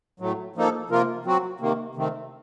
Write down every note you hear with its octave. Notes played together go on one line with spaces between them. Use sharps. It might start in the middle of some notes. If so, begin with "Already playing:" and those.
A2 F#3 A3
F3 A#3 D#4 A4
C3 F3 A#3 F4 A#4
F#3 C4 F#4
C3 D#3 A#3
C3 D#3 A3 C4